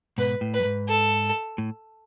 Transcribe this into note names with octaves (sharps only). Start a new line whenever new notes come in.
G#2 B2 B4
A2
B4
F#2
G#2
A4
A2